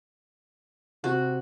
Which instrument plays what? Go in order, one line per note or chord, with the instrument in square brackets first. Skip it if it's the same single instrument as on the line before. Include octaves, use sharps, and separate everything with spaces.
[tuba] C3 [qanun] F#4